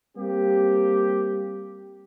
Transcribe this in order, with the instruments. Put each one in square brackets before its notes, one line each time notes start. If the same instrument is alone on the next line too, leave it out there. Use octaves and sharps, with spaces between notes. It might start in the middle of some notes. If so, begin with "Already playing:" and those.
[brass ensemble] G3 A#3 C4 G4